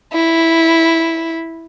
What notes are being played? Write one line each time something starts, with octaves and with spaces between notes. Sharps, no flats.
E4